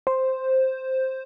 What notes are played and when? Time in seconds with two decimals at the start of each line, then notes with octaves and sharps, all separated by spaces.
0.07 C5